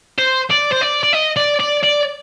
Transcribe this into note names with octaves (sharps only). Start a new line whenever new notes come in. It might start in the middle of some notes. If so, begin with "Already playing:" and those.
C5
D5
C5
D5
D5
D#5
D5
D5
D5